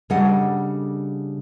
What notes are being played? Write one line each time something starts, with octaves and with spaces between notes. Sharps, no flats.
C#3 G3 D4 A4 D#5 F#5